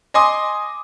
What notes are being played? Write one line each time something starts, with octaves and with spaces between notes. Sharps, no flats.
D#5 G#5 C6 D6 D#6